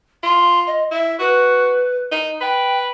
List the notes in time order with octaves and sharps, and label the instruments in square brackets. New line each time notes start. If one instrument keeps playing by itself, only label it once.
[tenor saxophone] F4 [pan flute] C6
[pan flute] D#5
[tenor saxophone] E4 [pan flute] E5
[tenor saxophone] F#4 [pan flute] B4
[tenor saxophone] D#4
[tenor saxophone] B4 [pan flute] G5